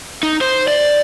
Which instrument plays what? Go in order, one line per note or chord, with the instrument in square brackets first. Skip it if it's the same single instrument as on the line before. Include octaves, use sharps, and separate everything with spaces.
[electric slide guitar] D#4
C5
D5